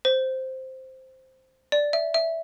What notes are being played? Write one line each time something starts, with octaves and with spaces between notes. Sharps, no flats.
C5
D5
E5
E5